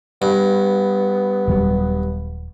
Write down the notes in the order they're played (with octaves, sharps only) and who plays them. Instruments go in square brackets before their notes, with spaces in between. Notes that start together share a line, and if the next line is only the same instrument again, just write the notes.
[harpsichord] G2 [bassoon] B3
[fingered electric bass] D#1 F#3 G3